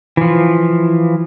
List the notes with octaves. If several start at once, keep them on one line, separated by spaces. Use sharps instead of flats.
E3 F3